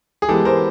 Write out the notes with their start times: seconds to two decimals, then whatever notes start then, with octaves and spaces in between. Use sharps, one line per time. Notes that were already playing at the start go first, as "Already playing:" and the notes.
0.22 G#4
0.28 E3 G#3 B3 G4 A4
0.45 A#4 C5